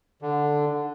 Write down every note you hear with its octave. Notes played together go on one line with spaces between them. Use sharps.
D3